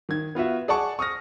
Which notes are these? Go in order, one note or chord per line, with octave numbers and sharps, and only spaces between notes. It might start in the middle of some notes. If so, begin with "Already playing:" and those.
D#3 G#6
B3 F4 F#4 E5
G#4 D5 F#5 A5 C#6
C#6 D#6 F6 A#6